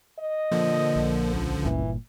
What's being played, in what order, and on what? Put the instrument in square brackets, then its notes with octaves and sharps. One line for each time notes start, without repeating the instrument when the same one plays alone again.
[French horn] D#5
[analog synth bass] A#2 [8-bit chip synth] D3 F3
[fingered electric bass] A#1
[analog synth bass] C#2
[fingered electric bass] G1 G2 A#2 [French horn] E3